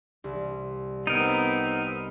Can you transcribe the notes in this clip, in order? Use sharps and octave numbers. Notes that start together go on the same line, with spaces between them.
C2
B3 C4 D#4 A#4